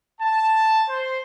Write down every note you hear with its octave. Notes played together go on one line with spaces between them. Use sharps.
A5
C5